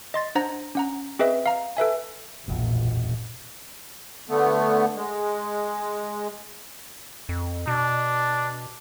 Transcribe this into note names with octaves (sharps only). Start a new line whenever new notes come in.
D#5 C6 A6
D4 C5 F#5 A#5 A#6
C#4 F#5 A#5
C4 G#4 B4 D#5 E5
F5 A#5
A4 B4 E5 G#5
E1 A#1 F#2
D3 A3 B3
G#3
F2
B2 D4